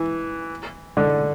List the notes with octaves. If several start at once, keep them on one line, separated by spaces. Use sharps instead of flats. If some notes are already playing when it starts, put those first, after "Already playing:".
Already playing: E3
D3